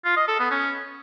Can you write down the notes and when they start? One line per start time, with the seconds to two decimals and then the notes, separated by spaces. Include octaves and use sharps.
0.05 F4
0.16 D#5
0.28 A4
0.40 B3
0.51 C#4